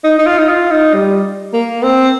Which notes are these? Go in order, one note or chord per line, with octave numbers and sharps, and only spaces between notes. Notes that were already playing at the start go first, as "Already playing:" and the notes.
D#4
D#4
F4
D#4
F4
D#4
G3
A#3
C4